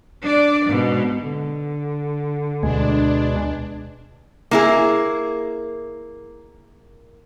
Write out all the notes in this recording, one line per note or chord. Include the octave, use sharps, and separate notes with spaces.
D4 D5
G#2 B2
D3
D2 B2 G#3 D4
A#3 E4 G#4